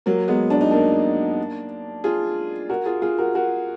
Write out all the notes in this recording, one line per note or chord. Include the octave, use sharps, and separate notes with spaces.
F#3 A#3
G#3 B3
D4
D#4
A#3 D4
F4 G#4
F#4 A#4
F4 G#4
F4 G#4
F#4 A#4
F#4 A#4